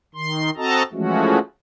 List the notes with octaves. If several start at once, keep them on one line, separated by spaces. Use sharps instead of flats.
D#3 C6
C4 F#4 A4 D#5 A5 A#5
E3 F3 G#3 A3 C#4 F#4